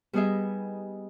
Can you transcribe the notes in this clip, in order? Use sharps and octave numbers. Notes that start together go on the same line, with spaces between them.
G3 B3 D#4 G#4 D#5 E5